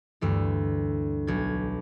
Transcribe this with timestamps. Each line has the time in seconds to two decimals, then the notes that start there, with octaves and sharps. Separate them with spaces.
0.21 D2 G2 E3
1.27 B1 G#6